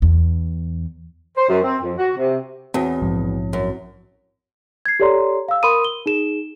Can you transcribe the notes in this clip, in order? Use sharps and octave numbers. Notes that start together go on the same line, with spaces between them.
E2
C5
F#2
C4
F2
F#4
C3
E2 C4 F#4 C#5
A#1 G#2 F3
F#2
G#6 C7
G4 A4 C#5 D5 A#5 C6
F5 E6
A#4 B5 C6 D#6 D#7
G7
D#4 G#4 E7